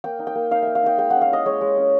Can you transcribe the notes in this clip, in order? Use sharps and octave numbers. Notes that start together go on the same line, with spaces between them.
A#3 G5
D#4
G5
A#3
D#4 F5
A#3 E5
F5
D#4 G5
G#3 G5
C#4 F#5
F5
E4 D#5
G#3 C#5
G#3
C#4